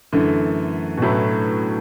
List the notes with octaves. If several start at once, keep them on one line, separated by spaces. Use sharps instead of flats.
F#2 D3 E3 A3
B2
A2 F#3 A3 E4 B4